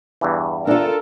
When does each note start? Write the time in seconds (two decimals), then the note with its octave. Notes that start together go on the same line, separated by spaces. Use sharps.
0.21 E2 G2 E3
0.67 D4 F4 A4 A#4